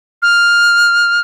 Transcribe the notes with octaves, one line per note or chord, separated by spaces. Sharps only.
F6